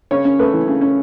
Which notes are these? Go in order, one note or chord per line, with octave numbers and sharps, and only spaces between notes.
C#3 C#5
C#4
A3 B4
E3
C#3
C#4